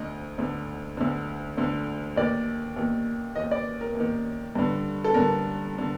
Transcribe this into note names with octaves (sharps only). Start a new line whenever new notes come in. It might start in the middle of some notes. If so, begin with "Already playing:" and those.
Already playing: D2 D3 D#5
D2 D3
D2 D3
D2 D3
D#2 D#3 D5
D#2 D#3
D#2 D#3 D#5
D5
A#4
D#2 D#3
G2 D3
A4
G2 D3 A#4
D3